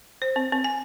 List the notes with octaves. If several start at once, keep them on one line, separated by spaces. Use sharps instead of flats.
C5
C4
C4
G#5